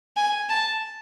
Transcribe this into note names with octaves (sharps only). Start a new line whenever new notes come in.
G#5
A5